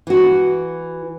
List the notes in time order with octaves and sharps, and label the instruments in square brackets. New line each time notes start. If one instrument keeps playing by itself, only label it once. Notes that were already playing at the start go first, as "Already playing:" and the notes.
[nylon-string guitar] E3 F#4